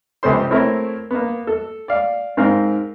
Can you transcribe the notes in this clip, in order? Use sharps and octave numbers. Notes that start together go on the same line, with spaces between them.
C#2 C3 B3 A4 C5 C6
A3 C4 E4 A#4 C#5 E5
A#3 B3
A4
D5 F5
G#2 C4 A#4 F5